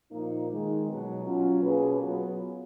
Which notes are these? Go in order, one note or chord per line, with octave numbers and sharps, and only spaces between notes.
A#2 F3 A#3 D#4
D#3 G#3 D#4
B2 F#3 B3
F#3 C#4 F4
B2 A#3 C#4 G#4 B4
F#3 B3 F4